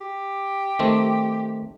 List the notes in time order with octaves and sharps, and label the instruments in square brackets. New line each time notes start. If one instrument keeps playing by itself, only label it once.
[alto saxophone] G4
[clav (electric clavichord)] D#3 A3 C4